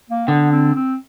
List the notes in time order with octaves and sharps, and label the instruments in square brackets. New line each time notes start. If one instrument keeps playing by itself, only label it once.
[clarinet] A#3
[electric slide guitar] D3 [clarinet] B3
[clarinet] C4
C4